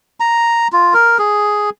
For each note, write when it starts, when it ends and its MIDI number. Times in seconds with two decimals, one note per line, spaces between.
0.20 0.68 82
0.72 0.94 65
0.94 1.18 70
1.18 1.70 68